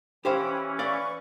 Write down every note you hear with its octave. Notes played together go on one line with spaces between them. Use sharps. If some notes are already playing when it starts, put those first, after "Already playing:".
E3 C#4 G4 C5 F5 G5 B5
B4 D5 F5 C#6